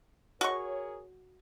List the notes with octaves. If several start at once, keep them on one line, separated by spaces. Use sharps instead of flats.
F#4 G#4 A#4 C#5 C#6